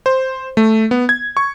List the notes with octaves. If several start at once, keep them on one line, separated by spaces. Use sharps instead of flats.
C5
A3
B3
G#6
C#6